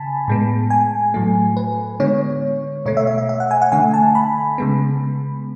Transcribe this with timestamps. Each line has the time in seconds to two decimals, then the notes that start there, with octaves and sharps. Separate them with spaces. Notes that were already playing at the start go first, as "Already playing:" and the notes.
Already playing: C#3 G#5 A5 B5
0.28 A2 G#3 B3
0.70 G#5
1.14 A2 F#3 A3
1.57 B4
2.00 D3 G#3 B3 C#5
2.86 B2 A3 C#5
2.97 E5
3.07 E5
3.18 E5
3.29 E5
3.40 F#5
3.51 G#5
3.62 F#5
3.72 D3 A3 G#5
3.94 A5
4.15 B5
4.58 C#3 G#3 B3